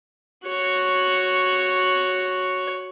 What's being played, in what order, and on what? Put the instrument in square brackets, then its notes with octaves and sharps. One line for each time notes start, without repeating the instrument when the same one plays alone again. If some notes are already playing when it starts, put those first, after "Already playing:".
[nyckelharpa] F#4 C#5